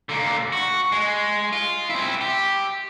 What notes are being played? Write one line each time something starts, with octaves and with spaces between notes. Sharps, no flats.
D3 A#3
F#4
G#3
F4
C4 E4
G4